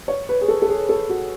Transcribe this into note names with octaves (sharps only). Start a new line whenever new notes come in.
C#5
B4
G#4
A4
A4
G#4
A4
F#4